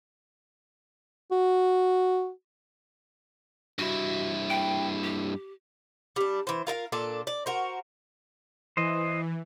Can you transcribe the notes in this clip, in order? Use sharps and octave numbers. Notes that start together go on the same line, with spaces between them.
F#4
G2 E4 F#4
G5
G4
G3 D4
E3 C5
F4 A#4 E5 F5
A#2 D4 A4
D5
F#4 A#4 C5
E3 C5 D#5